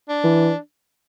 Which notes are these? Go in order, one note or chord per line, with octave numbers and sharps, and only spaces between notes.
D4
E3